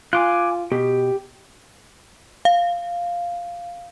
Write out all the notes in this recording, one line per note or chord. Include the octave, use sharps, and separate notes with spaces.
F4 G#5 D6 F#6
B2 G4
F5